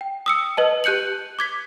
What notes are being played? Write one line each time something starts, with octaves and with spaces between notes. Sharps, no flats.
G5
D#6 E6 C#7
B4 D#5 A5
G4 F#6 G6 C#7 F#7
D6 G#6 B6